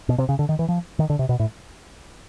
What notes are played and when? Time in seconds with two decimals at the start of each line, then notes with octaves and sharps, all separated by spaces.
0.09 B2
0.18 C3
0.29 C#3
0.39 D3
0.49 D#3
0.59 E3
0.69 F3
0.99 D#3
1.10 D3
1.19 C3
1.29 B2
1.39 A2